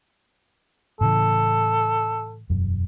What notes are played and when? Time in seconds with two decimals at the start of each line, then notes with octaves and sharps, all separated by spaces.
1.01 A2 C#3 E3 A4
2.50 E1 F#2